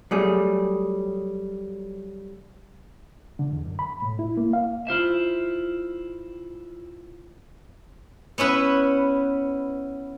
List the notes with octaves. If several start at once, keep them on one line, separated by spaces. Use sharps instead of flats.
F#3 G3 A3 G#4
D3
E2
F#2
B5
A2
E4
A#3
F5
E4 F4 C5 E5
B3 C#4 E4 B4